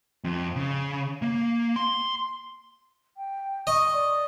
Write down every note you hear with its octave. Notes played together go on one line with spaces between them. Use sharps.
F2
C#3
A#3
C6
G5
D#5 C#6
D5